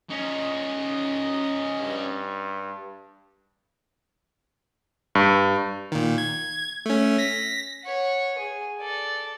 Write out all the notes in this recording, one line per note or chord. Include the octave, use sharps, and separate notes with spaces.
C#4 D#4 D#5
G2
G2
A#2 D#3
G#6
A3 C#4
A#6 B6
C#5 F#5
G#4
A4 D5